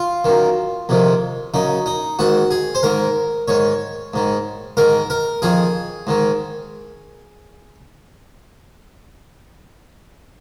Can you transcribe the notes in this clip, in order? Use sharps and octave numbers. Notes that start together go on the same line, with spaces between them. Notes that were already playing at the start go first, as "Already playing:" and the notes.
Already playing: F4
F#2 D#3
F2 C3 D#3
F#2 C#3 D#4
D#4
G#2 D#3 F#4
G#4
C5
G#2 D#3 A#4
G#2 D#3 C#5
G#2 D#3
G#2 D#3 A#4
A#4
F2 D#3 G#4
G#2 D#3